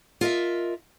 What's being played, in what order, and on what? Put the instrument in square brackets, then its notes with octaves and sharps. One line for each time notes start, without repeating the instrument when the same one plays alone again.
[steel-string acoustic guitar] F4 A#4 D#5 E5